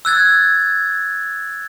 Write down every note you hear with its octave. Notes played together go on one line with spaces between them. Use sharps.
E6 F#6 G#6 A6